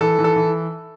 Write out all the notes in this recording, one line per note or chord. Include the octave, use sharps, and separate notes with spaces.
E3 A4
E3
A4
E3